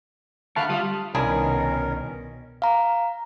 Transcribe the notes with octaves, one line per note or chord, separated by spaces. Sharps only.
D2 F5 A5 B5 C#6 F#6
G3 F4 D#6
C2 B2 D#3 C#4 D4 E4 G#4 A#4
F5 A#5